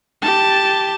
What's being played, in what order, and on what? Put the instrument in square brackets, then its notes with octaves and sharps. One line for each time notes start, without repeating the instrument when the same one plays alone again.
[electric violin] G4 A5